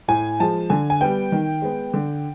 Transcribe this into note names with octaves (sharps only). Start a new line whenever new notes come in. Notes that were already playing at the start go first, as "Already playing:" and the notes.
A2 G#5
F3 G#3 A5
D3 G#5
G#5
G3 B3 G5
D#3
G#3 B3
D3